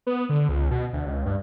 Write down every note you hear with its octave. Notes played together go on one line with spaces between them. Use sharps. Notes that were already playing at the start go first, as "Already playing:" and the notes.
B3
D3
C#2
B2
D2
C#2
G2